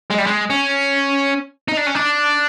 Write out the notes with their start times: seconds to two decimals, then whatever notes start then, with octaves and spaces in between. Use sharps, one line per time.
0.11 G#3
0.19 G3
0.27 G#3
0.50 C#4
1.68 D#4
1.77 D4
1.87 C#4
1.95 D4